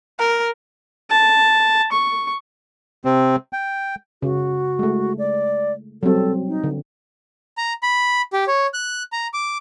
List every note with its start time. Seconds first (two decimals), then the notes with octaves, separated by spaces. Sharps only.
0.19 A#4
1.10 A5
1.92 C#6
3.05 C3 C4
3.53 G5
4.22 C#3 F#4
4.79 G#3 A3
5.18 D5
6.03 F#3 G3 C4 A4
6.48 D#4
6.64 D3
7.57 A#5
7.83 B5
8.33 G4
8.48 C#5
8.74 F#6
9.12 A#5
9.33 D6